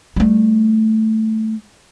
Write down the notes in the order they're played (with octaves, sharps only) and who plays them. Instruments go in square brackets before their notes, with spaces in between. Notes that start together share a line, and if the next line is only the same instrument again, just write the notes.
[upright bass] G3 A3